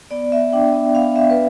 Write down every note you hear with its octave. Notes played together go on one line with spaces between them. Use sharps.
B3 D5
B3 E5
D4 G5
B3
B3 F5
B3 E5
B4